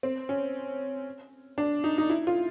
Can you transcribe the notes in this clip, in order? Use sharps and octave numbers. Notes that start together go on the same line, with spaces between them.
C4
C#4
D4
D#4
D#4
E4
F4